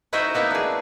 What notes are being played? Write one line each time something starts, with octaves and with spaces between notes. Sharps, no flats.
D#4 E4 F#4 C5 D#5 E5
A#3 B3 D#4 E4
D4 G#4